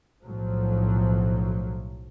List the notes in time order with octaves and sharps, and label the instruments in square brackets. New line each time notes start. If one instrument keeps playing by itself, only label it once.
[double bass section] B1 A2 F3 F#3